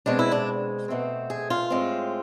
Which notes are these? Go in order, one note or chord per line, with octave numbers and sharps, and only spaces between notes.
B2 G#3 C4 D4
E4
D4
B2 A3 C4
G#4
F4
A2 G#3 C4